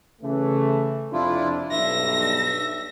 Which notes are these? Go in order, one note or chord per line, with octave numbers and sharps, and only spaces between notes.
C#3 E3 A3
F2 C3 D4 E4 F4
B1 G2 E5 A#6